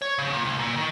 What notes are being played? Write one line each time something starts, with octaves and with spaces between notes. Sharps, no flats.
C#5
C#3
A#2
C2
A#2
D#3